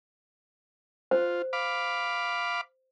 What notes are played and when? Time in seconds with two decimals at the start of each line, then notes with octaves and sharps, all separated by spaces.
1.11 F4 C5
1.53 F5 B5 D6